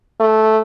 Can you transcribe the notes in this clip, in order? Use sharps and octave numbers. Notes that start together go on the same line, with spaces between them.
A3